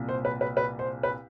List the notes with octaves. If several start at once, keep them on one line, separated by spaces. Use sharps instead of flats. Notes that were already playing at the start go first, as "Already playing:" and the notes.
Already playing: C2 A#2
C5
B4
B4
B4
C5
B4